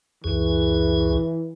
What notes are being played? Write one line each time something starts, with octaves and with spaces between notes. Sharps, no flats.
C#2 F#2 E3 G#4